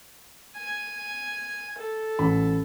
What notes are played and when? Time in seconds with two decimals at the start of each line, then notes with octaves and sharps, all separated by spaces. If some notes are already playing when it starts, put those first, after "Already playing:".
0.57 G#5
1.78 A4
2.19 A1 B5